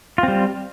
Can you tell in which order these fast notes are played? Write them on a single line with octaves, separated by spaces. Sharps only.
F4 C4 G3